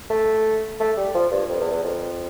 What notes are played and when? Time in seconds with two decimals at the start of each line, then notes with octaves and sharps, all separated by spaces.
0.10 A3
0.80 A3
0.97 G3
1.14 F3
1.31 G2
1.49 F2
1.60 E2
1.71 E2
1.83 F2